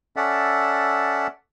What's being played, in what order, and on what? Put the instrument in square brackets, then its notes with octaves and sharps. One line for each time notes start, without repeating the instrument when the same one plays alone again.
[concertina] C#4 A4 D5 E5 F#5